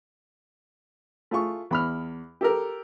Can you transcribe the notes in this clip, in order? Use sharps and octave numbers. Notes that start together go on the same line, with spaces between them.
A3 F4 G#4 C#6
E2 B5 F6
G4 A4 A#4